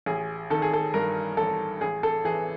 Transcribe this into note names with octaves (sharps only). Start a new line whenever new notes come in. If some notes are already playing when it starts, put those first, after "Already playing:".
A1 G#4
D#3 A4
G#4
A4
G2 A#4
A1 A4
A1 G#4
A4
E3 G#4